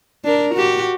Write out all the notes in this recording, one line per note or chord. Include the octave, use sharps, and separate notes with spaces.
D4 A#4
F#4 G4